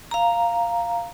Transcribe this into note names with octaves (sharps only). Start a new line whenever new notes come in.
F5 A#5